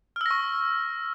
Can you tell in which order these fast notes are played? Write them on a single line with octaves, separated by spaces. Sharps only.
F6 E6 A#6 C#6